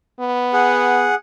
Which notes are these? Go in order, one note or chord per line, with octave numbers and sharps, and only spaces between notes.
B3
G#4 F#5